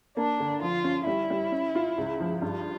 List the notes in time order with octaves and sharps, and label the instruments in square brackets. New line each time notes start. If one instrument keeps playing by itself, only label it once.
[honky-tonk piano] A#3 [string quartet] D4
[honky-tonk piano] D3
[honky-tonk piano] F3 [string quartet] F4
[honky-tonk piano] C#4
[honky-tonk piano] G3 [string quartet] E4
[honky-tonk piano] G3
C#4
F4
C#2
F3
[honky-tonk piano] G2 [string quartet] F4